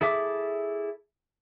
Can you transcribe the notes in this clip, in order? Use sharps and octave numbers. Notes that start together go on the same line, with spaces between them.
E4 G#4 A4 E5 D6